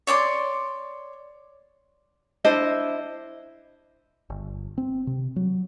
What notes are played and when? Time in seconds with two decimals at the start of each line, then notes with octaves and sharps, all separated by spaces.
0.07 C#5 D5 C6 D6
2.44 D4 E4 C5 D#5
4.30 G1
4.78 C4
5.07 C3
5.36 F#3